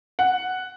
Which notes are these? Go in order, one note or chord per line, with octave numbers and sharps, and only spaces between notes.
F#5